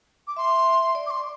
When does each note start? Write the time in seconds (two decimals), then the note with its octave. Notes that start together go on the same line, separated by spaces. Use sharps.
0.27 D6
0.36 E5 C6
0.95 D5
1.07 D6
1.11 C6